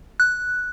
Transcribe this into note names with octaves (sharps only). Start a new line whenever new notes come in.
F#6